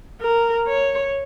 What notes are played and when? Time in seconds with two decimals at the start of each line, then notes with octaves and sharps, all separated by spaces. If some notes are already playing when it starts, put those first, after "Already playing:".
0.21 A#4
0.67 C#5